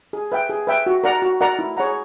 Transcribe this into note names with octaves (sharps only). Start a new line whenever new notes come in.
G#4
B4 E5 G5
G#4
B4 E5 G5
F#4
A#4 D5 F#5 A#5
F#4
A#4 D5 F#5 A#5
E4
G#4 C#5 F#5 A#5